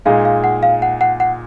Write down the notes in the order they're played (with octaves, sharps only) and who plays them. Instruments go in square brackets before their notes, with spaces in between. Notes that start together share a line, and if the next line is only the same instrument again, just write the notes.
[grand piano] A#2 G#3 D#4 G#4 [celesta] F5
[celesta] F5
F#5
F5
F#5
F#5
F#5